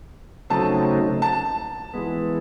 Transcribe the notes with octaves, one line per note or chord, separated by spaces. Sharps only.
C#3 F#3 A3 C4 D#4 A5
A5
E3 G#3 B3